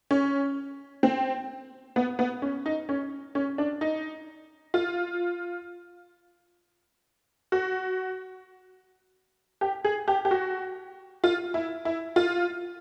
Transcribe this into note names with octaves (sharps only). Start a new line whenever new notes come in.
C#4
C4
B3
B3
C#4
D#4
C#4
C#4
D4
D#4
F4
F#4
G4
G#4
G4
G4
F#4
F4
E4
E4
F4